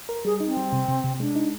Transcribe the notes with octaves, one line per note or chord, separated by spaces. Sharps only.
A#4
G3 G#4
D#4
C4
G3
C3
C3
C3
G#3 D4
D#4